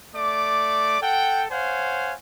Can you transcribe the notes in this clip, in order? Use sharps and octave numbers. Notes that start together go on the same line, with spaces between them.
A3 D5 D6
A4 F#5 G5
C5 C#5 F5 F#5 G#5